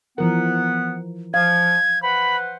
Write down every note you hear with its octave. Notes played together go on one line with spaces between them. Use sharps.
E3 F3 B3 A#4 F#5
F3 F5 G#6
B4 C5 F#5 B5